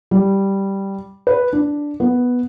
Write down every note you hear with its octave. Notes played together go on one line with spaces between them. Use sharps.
G3
B4
D4
B3